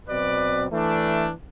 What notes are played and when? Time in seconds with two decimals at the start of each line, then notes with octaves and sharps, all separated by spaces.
0.09 B2 F#3 C4 B4 D5
0.71 E3 A3 D4